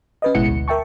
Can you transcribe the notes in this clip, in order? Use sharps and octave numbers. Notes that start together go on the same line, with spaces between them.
C#4 B4 D#5
A1 B2 G#3 E4 F#5 C#7
D2
A#4 E5 G5 A5 C#6